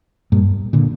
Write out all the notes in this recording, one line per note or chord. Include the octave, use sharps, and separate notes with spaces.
G2 A#2
A#2 D3